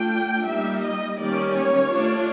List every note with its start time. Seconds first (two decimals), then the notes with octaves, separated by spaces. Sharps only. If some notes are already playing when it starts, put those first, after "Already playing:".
Already playing: A3 D4 F4 G5
0.46 G3 A#3 D#4 E5
0.82 D#5
1.18 D#3 G3 A#3 C#4 D5
1.55 C#5
1.90 A3 D4 F4